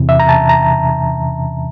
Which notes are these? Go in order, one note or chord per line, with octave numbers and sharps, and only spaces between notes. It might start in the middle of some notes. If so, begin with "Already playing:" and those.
Already playing: E2 C3 E3
E5
A#5
A5
A#5